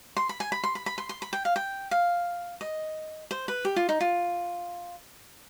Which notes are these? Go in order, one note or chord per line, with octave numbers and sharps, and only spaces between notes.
C6
B5
G#5
B5
C6
B5
B5
C6
C6
B5
G5
F5
G5
F5
D#5
C5
B4
G4
F4
D#4
F4